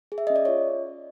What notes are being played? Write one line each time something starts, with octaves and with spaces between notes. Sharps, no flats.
G#4
E5
C#4 D#5
D5
F4 C#5